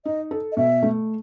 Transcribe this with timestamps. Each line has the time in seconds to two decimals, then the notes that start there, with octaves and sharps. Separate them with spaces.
0.05 D#4 D#5
0.31 A4
0.52 D#5
0.57 B2 E5
0.83 A3